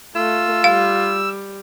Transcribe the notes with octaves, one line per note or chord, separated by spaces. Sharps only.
A3 F4 E6
G3 F5